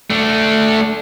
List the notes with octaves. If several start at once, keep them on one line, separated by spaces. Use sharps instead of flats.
A3 D4